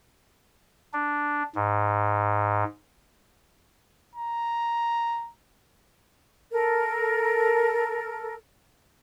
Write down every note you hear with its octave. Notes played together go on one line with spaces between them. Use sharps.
D4
G#2
A#5
A4 A#4